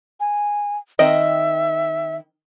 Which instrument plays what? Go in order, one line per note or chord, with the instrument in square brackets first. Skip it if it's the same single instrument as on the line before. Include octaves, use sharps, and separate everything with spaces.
[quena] G#5
[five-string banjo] D#3 C4 D#5 [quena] E5